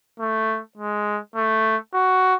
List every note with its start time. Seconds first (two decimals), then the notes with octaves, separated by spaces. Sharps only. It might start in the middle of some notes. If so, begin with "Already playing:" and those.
0.19 A3
0.78 G#3
1.36 A3
1.94 F#4